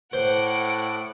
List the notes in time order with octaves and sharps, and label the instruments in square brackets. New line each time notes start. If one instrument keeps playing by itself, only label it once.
[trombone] A2 [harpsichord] C5 [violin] F#5 D6